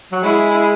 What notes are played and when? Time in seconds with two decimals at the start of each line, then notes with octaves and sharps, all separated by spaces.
0.12 F#3
0.22 G#3 E4 G#4